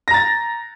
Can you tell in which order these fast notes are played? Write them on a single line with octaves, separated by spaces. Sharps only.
A#6 A#5 A6